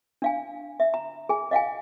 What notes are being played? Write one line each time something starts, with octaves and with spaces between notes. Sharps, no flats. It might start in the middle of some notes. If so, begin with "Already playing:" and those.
D4 F5 G#5
E5
A#5
G#4 G#5
D#5 F5 F#5 G#5